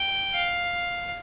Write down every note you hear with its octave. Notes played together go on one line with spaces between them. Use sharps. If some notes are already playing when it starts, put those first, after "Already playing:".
Already playing: G5
F5